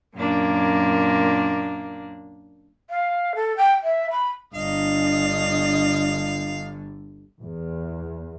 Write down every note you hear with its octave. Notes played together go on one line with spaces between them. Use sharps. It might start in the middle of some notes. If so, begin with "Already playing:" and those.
F#2 A#2 A#3 D4
F5
A4
G5
E5
B5
G1 D3 D4 D#5 F5
E2